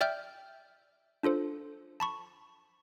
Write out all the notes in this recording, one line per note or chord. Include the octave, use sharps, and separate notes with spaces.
D5 E5 G5 F6 G6
D4 F4 A4 C5
A5 B5 C#6